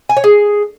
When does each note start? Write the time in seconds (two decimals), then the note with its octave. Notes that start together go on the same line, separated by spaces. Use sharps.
0.09 G#5
0.17 C#5
0.24 G#4